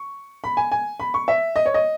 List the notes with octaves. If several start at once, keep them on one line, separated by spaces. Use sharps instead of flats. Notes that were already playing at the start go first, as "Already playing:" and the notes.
Already playing: C#6
B5
G#5
G#5
B5
C#6
E5
D#5
C#5
D#5